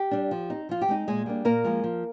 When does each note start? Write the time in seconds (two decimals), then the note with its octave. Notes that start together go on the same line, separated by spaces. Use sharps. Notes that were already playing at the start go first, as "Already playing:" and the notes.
Already playing: G4
0.11 G3 D4
0.31 F3
0.50 C4 D#4
0.69 F3 F4
0.81 G4
0.88 G#3 C4 D#4
1.07 A#2 G#3 G#4
1.26 G3 A#3 D4
1.45 A#2 A#3 A#4
1.64 F3 G#3
1.84 F3